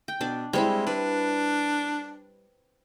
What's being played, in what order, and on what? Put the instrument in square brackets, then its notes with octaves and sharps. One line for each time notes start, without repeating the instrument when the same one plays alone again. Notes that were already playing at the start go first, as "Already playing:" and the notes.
[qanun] G5
[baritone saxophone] B2 [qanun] D4 D5
[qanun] G3 C4 E4 [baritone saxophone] G#3
[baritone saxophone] D4 [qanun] B4